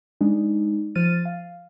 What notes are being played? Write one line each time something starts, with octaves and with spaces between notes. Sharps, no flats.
G#3 D4 D#4
F3 C5 F6 A6 D#7
F5